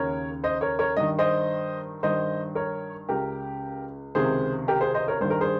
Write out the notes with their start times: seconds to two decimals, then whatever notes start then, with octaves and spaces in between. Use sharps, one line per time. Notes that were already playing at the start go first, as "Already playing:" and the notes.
Already playing: D#2 C#3 A#4 C#5
0.44 C5 D#5
0.61 A#4 C#5
0.79 A#4 C#5
0.97 G2 D#3 D#5
1.19 C5 D#5
2.03 G2 D#3 C5 D#5
2.55 A#4 C#5
3.09 C#2 C#3 G4 A#4
4.15 C#2 C3 D#3 G#4 C5
4.68 G4 A#4
4.81 G#4 C5
4.94 C5 D#5
5.08 A#4 C#5
5.21 G2 D#3 C5
5.30 A#4
5.41 G#4 C5